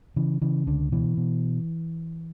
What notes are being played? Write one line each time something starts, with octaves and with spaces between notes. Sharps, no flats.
C#3 E3
C#3 E3
C#2 D3
B2 E3
B2